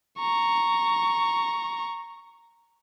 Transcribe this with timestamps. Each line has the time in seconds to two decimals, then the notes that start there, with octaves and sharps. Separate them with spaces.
0.18 A#5 C#6